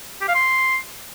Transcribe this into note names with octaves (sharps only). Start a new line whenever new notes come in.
G4
F5
C6